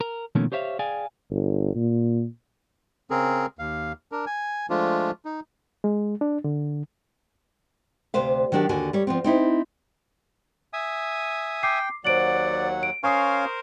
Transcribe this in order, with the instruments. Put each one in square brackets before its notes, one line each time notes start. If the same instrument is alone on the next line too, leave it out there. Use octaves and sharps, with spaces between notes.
[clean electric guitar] A#4
B2 D#3 F3 A3 A#3 C#4
G4 C5 C#5 E5 F5
G#4 D5 F5 G5 G#5
[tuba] G1
A#2
[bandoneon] C#3 C4 G#4 A#4
D#2 F5
D4 A#4
G#5
F3 G#3 A3 D4 F4
D#4
[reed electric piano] G#3
D4
D3
[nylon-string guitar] D2 C3 B4 C5 F5
D#3 F#3 D4 F#4 G4
D#2 D3 F#4 G#5
G3 C#5
F3 B3 C4
C4 D#4 E4
[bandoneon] E5 G#5 D#6
[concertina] G5 [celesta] D6 C7
[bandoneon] D#2 F#3 F#5 [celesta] C5 D7 F#7 [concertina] D5
[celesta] D7
[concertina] C#4 F5 G#5 [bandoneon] A#4 C5 [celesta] C#6 D#6 C7